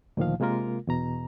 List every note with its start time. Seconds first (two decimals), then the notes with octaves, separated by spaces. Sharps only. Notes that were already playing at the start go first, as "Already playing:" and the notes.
0.17 D2 A#2 D#3 F3 F5
0.40 C3 G#3 A#3 F4 A#4
0.87 E2 B2 A#5